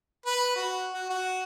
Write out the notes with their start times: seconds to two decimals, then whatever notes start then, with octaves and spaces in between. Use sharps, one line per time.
0.26 B4
0.56 F#4
0.93 F#4
1.10 F#4